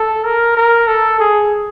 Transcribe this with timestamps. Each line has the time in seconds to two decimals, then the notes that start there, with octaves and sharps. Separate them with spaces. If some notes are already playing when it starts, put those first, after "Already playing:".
Already playing: A4
0.26 A#4
0.57 A#4
0.88 A4
1.20 G#4